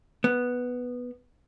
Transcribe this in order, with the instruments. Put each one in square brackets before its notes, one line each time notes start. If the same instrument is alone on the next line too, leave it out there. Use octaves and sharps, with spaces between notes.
[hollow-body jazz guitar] B3